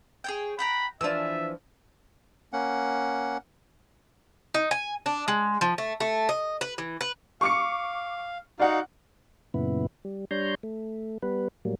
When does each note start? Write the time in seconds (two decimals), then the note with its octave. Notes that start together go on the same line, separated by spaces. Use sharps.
0.24 G#4 C#5 G5
0.59 F#5 G5 A#5 B5
1.01 E3 F3 D4 F4 E5 E6
2.53 A#3 C#4 F#5
4.54 D#4
4.71 G#5
5.06 D4
5.28 G#3
5.61 F3
5.78 A3
6.00 A3
6.29 D#5
6.61 B4
6.78 E3
7.01 B4
7.41 F5 C#6 D6 C#7
8.59 D#4 F#4 D5 F5 F#5
9.54 F#2 A#2 C#3 B3 E4
10.05 G3
10.31 G3 D4 C#5 A#5 C6 G6
10.63 A3
11.22 G3 B3 B4
11.65 A2 F#3 G3 A#3